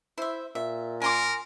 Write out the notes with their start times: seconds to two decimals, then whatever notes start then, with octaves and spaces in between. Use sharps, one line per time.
0.18 E4 C5 E5
0.55 A#2 E5
1.02 A#4 G#5 C6 D6